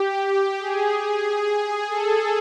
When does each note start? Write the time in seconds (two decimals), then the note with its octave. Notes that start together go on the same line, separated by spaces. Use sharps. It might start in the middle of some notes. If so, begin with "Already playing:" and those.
Already playing: G4
0.16 G4
0.59 G#4
1.88 A4